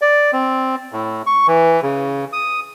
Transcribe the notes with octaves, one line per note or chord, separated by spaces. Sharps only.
D5
C4
A2
C#6
E3
C#3
D#6